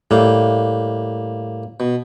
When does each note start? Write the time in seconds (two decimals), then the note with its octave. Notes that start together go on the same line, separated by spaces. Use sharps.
0.11 A2 G3 A#3 F5
1.80 B2